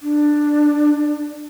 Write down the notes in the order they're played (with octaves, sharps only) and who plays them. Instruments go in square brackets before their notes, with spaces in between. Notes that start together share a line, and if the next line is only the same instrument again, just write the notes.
[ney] D4